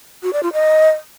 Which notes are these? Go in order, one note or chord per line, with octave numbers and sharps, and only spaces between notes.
F#4
D5
F4
D#5